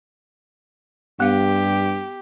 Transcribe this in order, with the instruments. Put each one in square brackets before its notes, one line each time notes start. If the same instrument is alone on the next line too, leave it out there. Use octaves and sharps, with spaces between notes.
[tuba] G2 [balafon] B3 F5 G5 [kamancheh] G4